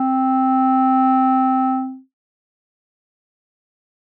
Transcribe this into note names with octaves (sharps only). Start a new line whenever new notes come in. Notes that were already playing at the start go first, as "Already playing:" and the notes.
Already playing: C4